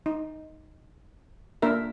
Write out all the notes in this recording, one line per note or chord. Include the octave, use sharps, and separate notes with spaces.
D#4
A#3 D4 A#4 E5